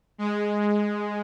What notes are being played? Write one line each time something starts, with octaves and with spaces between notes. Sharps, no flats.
G#3